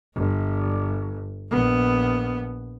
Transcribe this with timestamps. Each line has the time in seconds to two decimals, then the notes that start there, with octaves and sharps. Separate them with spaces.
0.15 G1
1.50 A#1 B3